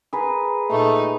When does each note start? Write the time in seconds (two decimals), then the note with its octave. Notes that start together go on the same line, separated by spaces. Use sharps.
0.13 G#4 B4 A#5
0.70 A#2 A3 D#4